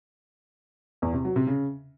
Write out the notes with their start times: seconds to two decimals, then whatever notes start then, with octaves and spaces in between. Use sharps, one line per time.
1.02 E2
1.13 C3
1.25 F#3
1.36 C3
1.47 C#3